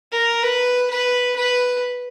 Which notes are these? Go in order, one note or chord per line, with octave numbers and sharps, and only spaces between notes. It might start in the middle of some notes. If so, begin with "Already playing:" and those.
A#4
B4
B4
B4